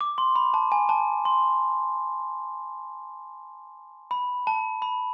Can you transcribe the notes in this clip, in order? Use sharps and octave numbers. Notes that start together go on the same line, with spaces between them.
D6
C6
B5
A5
G#5
A5
C6
B5
A5
B5